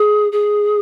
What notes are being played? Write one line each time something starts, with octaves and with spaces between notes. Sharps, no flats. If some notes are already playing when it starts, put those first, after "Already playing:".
Already playing: G#4
G#4